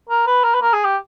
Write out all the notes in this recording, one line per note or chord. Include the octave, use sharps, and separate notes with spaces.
A#4
B4
A#4
B4
A#4
G#4
G4